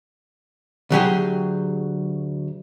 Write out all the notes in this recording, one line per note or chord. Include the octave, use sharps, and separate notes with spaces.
D2 F#3 G4 G#4